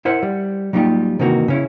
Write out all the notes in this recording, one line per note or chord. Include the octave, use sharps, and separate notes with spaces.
E4 A#4 C5 E5 F#5
G3
F#3 G3 A#3 D#4 F4 G4
C3 D#3 E3 A#3 D#4 F#4
C#3 C#4 E4